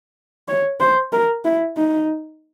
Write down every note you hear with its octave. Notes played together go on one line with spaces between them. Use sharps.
C#5
C5
A#4
E4
D#4